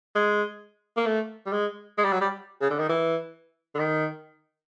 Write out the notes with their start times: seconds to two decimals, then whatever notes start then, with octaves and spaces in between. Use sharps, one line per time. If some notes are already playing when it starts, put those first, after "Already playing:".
0.15 G#3
0.97 A#3
1.06 A3
1.46 G3
1.52 G#3
1.98 G#3
2.04 G3
2.12 F#3
2.21 G3
2.61 C#3
2.70 D3
2.79 D#3
2.89 E3
3.75 D3
3.79 D#3